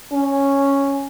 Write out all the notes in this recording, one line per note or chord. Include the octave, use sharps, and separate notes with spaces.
C#4